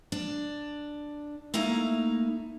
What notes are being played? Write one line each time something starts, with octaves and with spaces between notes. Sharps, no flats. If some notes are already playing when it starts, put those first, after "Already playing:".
D4
A3 A#3 D#4 E4 A#5